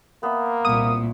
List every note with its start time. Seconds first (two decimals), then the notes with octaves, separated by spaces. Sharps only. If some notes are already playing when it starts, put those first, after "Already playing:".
0.23 A#3 B3 E5
0.65 C2 A#2 D#6